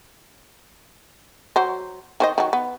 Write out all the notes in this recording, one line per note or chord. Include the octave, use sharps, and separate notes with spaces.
F#3 C5
D#3 C5 D#5
D#3 F#3
B3